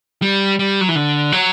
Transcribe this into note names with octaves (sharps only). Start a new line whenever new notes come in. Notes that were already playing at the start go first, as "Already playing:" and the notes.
G3
G3
F#3
E3
D3
F#3